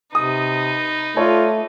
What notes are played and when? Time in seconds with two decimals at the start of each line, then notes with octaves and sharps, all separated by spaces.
0.15 C3 D#4 B4 D#6
1.16 A3 F4 A4 C#5 D5